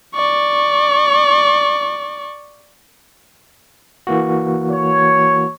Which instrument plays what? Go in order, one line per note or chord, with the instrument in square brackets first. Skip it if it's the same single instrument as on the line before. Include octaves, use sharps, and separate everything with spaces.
[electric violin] D5 C#6
[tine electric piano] E3 A#3 F#4
[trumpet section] C#5